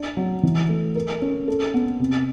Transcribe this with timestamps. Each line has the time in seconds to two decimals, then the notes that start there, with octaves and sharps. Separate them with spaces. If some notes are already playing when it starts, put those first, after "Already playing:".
Already playing: D4
0.17 F#3
0.43 E3
0.69 A3
0.95 A#4
1.22 C#4
1.48 A4
1.74 B3
1.99 C3